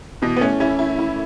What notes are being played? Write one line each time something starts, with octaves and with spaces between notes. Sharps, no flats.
B2 E3
B3
A3 C#4
C#4 E4
E4
E4